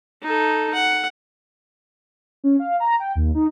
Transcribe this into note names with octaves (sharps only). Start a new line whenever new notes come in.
D#4 A4
F#5
C#4
F5
A#5
G5
D#2
D#4